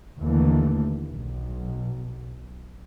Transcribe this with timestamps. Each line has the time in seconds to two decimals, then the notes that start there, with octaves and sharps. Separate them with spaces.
0.21 D#2 D3 E3 A3
1.12 B1